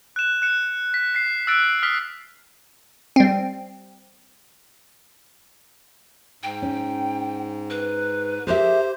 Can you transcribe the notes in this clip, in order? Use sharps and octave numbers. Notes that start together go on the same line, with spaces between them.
F#6 E7
F#6 C#7 E7
B6
B6 C7
E6 F#6 A6 D7
D#6 F6 B6
G3 C4
G#2 G5
C#4
B4
G4 G#4 A#4 C5 E5